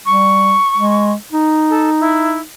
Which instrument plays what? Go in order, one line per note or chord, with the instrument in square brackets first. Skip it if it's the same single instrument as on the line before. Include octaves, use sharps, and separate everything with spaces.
[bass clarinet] G3 [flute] C#6
[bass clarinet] G#3
D#4
[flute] A4
E4